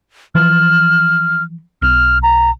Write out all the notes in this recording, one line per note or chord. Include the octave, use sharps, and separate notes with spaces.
E3 F3 F6
B1 F6
A#5